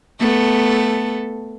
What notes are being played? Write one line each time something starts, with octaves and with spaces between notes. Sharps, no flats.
A3 B3 A4